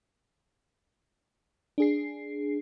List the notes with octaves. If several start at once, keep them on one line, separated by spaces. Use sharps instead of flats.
D4 G#4 C7